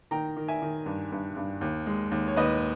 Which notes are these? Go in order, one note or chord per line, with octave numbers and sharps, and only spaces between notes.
D#3 G5 A#5
D#3
E5 G#5
D#3
G2
G2
G2
D#2
G#3
D#2
C#5
D#2 B4 D#5